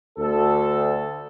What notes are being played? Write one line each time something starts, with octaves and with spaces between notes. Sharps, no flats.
D2 A4